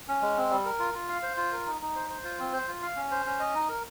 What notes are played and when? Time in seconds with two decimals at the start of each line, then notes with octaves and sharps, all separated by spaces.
0.08 C#4
0.22 G#3
0.37 C4
0.51 G3
0.66 A#4
0.80 F4
0.94 F4
1.09 F5
1.23 C5
1.37 F4
1.52 A#4
1.67 D#4
1.81 D#4
1.95 C5
2.10 C5
2.24 F4
2.39 C4
2.53 C5
2.68 F4
2.82 F5
2.96 C#4
3.11 C5
3.26 C#4
3.40 D#5
3.55 D#4
3.69 A#4